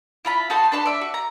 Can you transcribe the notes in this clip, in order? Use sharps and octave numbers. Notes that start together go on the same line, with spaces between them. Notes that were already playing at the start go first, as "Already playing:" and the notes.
E4 F4 B5
D#4 F#4 A5 C6
D4 B4 A5 C6
D5 E5
F#4
A#5